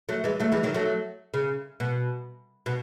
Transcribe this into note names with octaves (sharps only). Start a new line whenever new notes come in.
F#3 A3
E3 G#3
F#3 A3
E3 G#3
D#3 F#3
F#3 A3
C#3
B2
B2